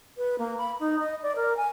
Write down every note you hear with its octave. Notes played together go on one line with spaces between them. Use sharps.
B4
A#3
B5
D#4
D#5
D5
A#4
G#5